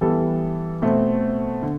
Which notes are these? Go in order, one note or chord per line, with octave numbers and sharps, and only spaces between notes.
E3 G3 B3 A4
B2 A3 C4
D3